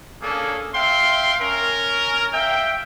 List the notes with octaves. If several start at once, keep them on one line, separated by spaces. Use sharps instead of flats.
A#3 C#4 D4 G#4 A4
E5 F5 G5 C6
C#4 A#4
E5 F5 G5